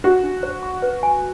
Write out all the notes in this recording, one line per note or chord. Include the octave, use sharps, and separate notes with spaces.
D4 F#4
D4
C5
C#6
B4
G#5